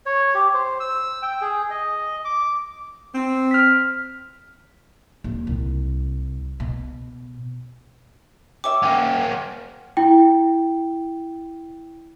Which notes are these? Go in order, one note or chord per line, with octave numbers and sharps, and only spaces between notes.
C#5
G4
C5
E6
G5
G#4
D#5
D6
C4
F6 B6
D#1
C2
B2
G4 C#5 E5 D6
A#3 C#4 F#5 G5
E4 G5